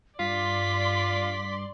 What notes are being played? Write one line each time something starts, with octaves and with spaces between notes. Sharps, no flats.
G2 F4 D5 C6 B6